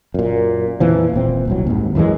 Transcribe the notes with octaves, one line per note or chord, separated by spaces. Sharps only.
F#2 A#2
F2 A#2 E3 F3
D#1 A#2 C4
D#1 C2 F#3
D#2 G#2
F#2 E3 G3 G#3